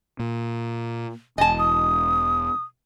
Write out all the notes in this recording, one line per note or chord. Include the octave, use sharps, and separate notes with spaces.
A#2
E1 D#5 G#5 A5
D#6